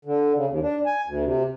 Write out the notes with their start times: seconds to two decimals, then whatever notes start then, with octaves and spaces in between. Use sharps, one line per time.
0.05 D3
0.35 C#3
0.49 D#2
0.62 D4
0.86 G#5
1.06 D2
1.25 C3